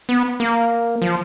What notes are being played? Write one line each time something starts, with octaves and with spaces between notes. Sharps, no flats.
B3
A#3
F3